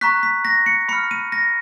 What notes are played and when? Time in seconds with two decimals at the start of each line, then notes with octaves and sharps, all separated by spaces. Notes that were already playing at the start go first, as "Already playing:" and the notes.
0.01 A#5 C#6 F#6 B6
0.23 B6
0.45 A#6
0.66 C#7
0.89 B5 F6 C#7
1.11 D#7
1.32 A#6